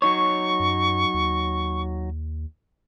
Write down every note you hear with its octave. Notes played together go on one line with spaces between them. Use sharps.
F#3 D#4 C#5 C#6
F#2
D#2